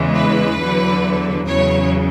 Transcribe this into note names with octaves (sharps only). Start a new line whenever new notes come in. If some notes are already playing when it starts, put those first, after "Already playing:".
Already playing: E2 C#3 E3 G#3
B4
E2 D3 F#3
E2 C#3 F#3 C#5